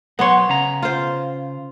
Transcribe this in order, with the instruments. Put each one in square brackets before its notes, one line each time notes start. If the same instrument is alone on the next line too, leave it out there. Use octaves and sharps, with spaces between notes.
[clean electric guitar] F#3 C6 [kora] B3 C#5
[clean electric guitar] C#3 A#5
[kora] F4 C5